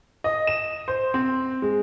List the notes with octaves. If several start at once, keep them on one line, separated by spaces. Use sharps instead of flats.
D#5
E7
C5
C4
G#3